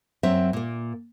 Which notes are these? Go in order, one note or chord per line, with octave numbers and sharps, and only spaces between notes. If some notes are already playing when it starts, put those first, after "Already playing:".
F#2 F#3 C4 E5
A#2 A#3